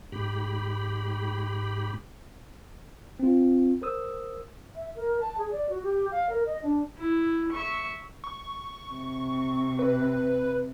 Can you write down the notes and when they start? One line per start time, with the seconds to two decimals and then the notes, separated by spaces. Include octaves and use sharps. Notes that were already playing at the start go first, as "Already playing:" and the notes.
0.12 G#2 G4 B5
3.19 C4 F4
3.82 A#4 C5 D#6 E6
4.76 E5
4.95 A#4
5.21 A5
5.38 G#4
5.51 D5
5.69 F#4
5.83 G4
6.11 F5
6.29 A#4
6.46 D#5
6.62 D4
6.98 E4
7.52 E5 C#6
8.24 C#6
8.90 C3
9.79 B4